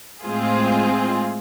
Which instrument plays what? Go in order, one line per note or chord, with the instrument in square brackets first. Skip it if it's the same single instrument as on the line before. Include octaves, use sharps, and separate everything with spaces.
[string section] A2 G#3 C4 F4 G#4